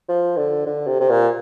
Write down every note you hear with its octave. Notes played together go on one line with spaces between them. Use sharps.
F3
D3
D3
C3
C3
A#2